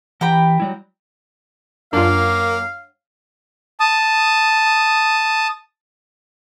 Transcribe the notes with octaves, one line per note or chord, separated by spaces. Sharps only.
E3 G4 G5 A#5 B5
F#3 G3 E4
F#2 A#3 D4 F4 F5
A5 D#6